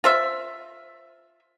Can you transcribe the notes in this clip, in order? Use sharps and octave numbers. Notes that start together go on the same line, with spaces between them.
F4 C5 E5